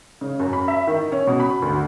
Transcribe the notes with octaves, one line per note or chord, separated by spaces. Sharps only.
C#3
F#2
B5
E5
D#3
C#4
B2
B5
D2